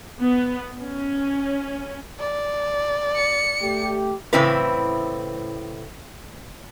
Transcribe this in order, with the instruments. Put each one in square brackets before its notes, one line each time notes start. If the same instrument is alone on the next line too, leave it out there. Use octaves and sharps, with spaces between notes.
[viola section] B3
C#4
[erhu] D5
[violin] C#7
[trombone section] A3 G4
[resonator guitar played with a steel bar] A2 C#3 E3 C4 E4 B4